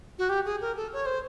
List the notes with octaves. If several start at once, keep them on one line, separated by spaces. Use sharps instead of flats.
F#4
G4
G#4
A#4
A4
C#5
C5